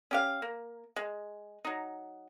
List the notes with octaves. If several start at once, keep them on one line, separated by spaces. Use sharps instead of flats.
C#4 G4 F5
A#3
G#3
F#3 D#4